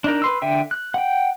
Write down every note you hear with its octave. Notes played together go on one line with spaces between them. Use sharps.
D4 D#4 A#4
B4 C6 E6
D3 E5 G5
F#6
F#5 G5